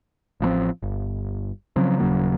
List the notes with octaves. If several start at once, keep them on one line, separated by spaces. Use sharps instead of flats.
A1 F3 F#3 C4
G1
C#3 F3 F#3 C4
D#1 C#3 F#3 A#3